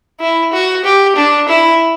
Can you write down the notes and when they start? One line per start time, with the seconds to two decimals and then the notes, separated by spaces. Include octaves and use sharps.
0.20 E4
0.53 F#4
0.84 G4
1.16 D4
1.49 E4